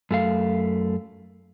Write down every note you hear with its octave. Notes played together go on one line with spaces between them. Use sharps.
F#2 A3 F5